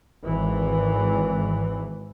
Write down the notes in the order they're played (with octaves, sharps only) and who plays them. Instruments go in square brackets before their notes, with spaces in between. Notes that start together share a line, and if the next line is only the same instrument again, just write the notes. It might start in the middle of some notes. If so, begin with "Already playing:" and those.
[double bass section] G#1 E3